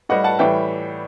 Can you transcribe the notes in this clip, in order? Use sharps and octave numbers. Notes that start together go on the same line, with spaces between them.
A2 G3 D#5 F#5
F#5 A5
A2 E3 G3 E5 G5